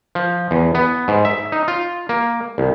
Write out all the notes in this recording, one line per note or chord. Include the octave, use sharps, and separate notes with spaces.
F3
E2
B3
G#2
E5
D#4
F4
A#3
C2